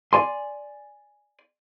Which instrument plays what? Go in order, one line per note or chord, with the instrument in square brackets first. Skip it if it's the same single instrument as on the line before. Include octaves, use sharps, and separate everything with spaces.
[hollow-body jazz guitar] D5 G#5 C6